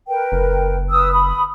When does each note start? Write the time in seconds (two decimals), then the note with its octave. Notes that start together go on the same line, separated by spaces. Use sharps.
0.08 A#4 B4 G5
0.32 F#1
0.90 B4 D#6 E6
1.12 B5 D#6